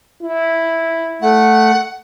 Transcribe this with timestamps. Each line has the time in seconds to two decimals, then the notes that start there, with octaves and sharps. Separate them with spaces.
0.22 E4
1.22 A3 F#5